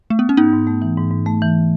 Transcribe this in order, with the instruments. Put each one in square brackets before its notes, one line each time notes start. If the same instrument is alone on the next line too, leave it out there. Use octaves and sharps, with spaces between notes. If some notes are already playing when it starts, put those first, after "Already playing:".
[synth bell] A3
B3
C#4
[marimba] G#2 [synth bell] B3 D#4
[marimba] G#2
A3
E3
G#2
G#2
A3
E3